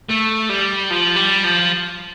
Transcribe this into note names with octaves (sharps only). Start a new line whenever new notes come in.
A3
G3
F3
G3
F3